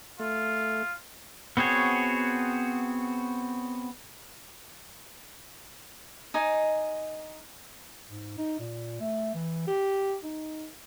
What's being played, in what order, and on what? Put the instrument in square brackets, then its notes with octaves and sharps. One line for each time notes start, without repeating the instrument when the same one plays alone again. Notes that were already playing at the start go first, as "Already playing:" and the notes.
[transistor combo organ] A3 [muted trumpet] F4
[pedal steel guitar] B3 C4 F#4 G#4 C#5
[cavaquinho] D#4 D#5 G#5
[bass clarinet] G#2
D#4
A#2
A3
E3
G4
D#4